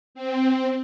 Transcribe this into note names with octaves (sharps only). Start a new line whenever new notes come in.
C4